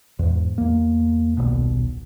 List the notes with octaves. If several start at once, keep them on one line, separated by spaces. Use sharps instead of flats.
E2 G#2
E2 A#3
D#1 B1 B2